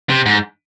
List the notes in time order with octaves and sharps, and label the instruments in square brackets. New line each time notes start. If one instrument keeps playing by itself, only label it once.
[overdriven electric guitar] C3
G#2